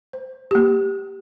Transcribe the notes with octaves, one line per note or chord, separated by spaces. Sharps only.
C5
A#3 G4